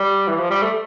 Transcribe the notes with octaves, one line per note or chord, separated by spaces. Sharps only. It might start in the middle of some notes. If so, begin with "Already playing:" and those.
Already playing: G3
E3
F3
G3
A3